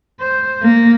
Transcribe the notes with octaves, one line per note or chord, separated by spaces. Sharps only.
C5
A#3